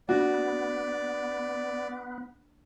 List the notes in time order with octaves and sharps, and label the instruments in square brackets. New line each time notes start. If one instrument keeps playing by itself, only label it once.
[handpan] A#3 D4 [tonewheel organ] B3 [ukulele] F#4 [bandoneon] D5